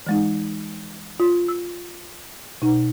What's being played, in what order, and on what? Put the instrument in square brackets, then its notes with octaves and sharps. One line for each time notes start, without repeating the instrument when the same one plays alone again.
[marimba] E3 G#3 D#4
F4
E6
B2 D#4